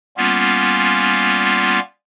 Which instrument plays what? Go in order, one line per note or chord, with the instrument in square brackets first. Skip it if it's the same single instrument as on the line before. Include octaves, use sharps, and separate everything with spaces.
[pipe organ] G3 A#3 B3 C#4 F4